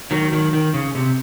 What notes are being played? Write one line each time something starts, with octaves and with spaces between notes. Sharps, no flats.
D#3 F#3
D#3 F#3
D#3
C#3
C3